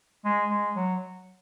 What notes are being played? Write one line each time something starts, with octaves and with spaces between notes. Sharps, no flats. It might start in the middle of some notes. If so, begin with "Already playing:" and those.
G#3
G#3
F#3